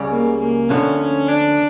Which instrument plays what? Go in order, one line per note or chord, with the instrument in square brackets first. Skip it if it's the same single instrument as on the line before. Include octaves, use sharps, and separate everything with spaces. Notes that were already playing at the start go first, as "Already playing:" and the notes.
Already playing: [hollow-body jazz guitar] C#2 C#3 G3
[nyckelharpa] A#3
A#3
[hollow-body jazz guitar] D2 D3 F3 [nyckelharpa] C#4
[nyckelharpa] C#4
D4